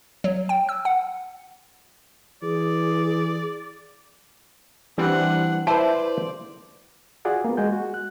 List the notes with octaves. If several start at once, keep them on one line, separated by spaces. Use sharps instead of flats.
F#3
G5
E6
F#5
E3 G#4 D5
E3 G3 C4 D4 F#5
E4 B4 C5 D5 A5
F4 F#4 G#4 D5 F#5
A#3 B3
G#3 F#4 G#5 G6
F#4
F#6